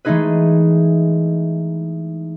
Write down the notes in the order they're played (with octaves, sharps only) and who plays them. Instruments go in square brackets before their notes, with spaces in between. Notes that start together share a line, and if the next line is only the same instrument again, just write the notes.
[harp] E3 G#3 A3 D#4 G#4 B4